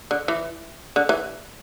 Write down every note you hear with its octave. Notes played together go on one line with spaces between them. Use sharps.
D3
E3
D3
E3